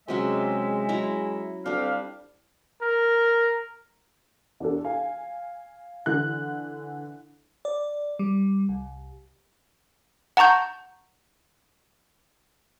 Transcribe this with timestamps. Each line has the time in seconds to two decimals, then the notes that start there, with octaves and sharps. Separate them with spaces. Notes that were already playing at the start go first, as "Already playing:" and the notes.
0.08 C3 F#3 G#3 C#4 E5
0.89 F#3 E4 A#5
1.66 D2 G3 C4 D4 F5
2.81 A#4
4.60 E2 D4 A4
4.85 F5 G#5
6.06 D3 E3 F#6
7.65 D5
8.19 G3
8.69 C2
10.37 F#5 A5 A#5 C#6 G6